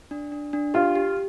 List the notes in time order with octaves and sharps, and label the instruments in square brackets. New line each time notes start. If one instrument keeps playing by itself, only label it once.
[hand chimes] D4
D4
D4
[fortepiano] F4 [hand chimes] G4
[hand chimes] G4